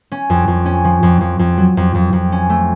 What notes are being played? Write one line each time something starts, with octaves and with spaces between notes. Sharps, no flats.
C#4
F2
F2
C#4
F3
F2
F2
F2
F#3
F2
F2
F2
C#4
A3